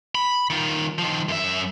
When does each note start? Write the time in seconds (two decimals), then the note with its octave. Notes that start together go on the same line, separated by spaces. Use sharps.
0.15 B5
0.50 D#3 F4
0.98 D#3 F3
1.29 F#2 E5